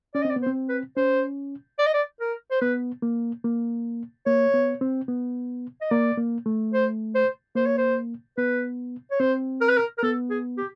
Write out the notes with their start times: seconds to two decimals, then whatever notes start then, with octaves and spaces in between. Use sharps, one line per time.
0.14 C#4 D5
0.22 D#5
0.25 C4 D5
0.36 B3
0.42 C5
0.46 C4
0.69 B4
0.97 C#4 C5
1.79 D5
1.86 D#5
1.94 D5
2.21 A#4
2.51 C5
2.61 B3 B4
3.02 A#3
3.44 A#3
4.26 A#3 C#5
4.54 B3
4.81 C4
5.08 B3
5.81 D#5
5.91 A#3 D5
6.18 A#3
6.46 A3
6.73 C5
7.15 C5
7.56 A#3 C5
7.66 C#5
7.77 C5
8.38 B3 B4
9.11 C#5
9.20 C4 C5
9.61 A#4
9.69 B4
9.77 A#4
9.98 A#4
10.03 B3 A4
10.30 G#4
10.57 G4